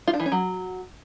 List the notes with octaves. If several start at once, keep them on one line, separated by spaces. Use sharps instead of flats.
F4
D4
E3
C#4
F#3